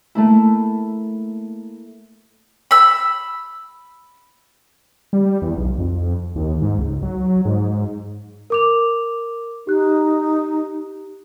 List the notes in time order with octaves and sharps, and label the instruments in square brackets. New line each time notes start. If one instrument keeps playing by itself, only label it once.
[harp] A3 A#3 E4
[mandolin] B5 E6
[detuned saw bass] G3
E2
B1
F2
D#2
G#2
C#2
F#3
G#2
[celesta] A#4 D6 F7
[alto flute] D#4 [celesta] G4 F#6